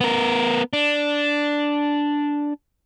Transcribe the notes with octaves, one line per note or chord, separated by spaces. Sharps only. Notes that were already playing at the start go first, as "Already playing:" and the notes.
B3 A#4
D4